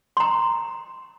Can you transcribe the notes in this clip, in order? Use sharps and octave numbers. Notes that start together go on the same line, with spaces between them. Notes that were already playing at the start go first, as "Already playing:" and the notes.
A#5 C6